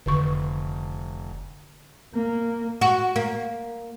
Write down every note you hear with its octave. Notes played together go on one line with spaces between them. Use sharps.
F1 D3 D#3 C#6
A#3
F#4
A#3